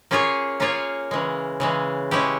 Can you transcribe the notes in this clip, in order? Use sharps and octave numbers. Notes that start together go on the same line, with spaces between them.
A#3 C#4 F4 G#4 C#5
A#3 C#4 F4 G#4 C#5
C#3 E3 G#3
C#3 E3 G#3
G#3 C#4 E4 G4